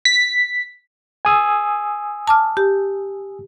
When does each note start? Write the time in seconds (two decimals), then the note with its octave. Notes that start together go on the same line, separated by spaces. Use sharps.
0.05 B6
1.25 G#5 D#6 E6
2.28 A5 D6 F6
2.57 G4